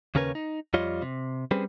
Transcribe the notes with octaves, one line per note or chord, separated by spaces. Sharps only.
D#2 C#3 C#4 A#4 B4 C#5
D#4
F2 G3 F4 C#5 D#5
C3
G3 C4 C#4 G#4 B4 C5